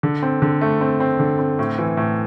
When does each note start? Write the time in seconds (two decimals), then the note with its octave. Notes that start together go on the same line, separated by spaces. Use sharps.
0.03 D3
0.23 C4
0.42 D3
0.61 A3
0.81 C4
1.00 C4
1.19 D3
1.39 C4
1.59 A2
1.78 E3
1.97 A2